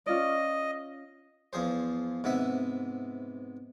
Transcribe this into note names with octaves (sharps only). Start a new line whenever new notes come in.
C#4 F4 D5 D#5
E2 F3 G#4 C5
G#2 C3 B3 E5 F#5